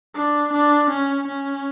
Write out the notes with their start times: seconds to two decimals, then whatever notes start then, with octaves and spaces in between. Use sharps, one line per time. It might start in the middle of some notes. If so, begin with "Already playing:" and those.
0.15 D4
0.52 D4
0.90 C#4
1.27 C#4